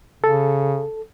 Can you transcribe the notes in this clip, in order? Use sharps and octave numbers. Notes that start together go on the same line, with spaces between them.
C#3 A4